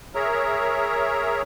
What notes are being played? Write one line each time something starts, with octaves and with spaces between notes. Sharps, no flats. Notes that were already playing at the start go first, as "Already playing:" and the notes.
G#4 A#4 C#5 E5 A#5